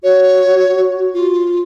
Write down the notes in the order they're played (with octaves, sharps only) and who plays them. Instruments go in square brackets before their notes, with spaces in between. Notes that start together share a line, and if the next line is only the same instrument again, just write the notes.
[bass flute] F#4 [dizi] C#5
[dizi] F4